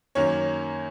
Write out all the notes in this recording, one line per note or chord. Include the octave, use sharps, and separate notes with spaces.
F#2 D#3 A#3 C#4 C#5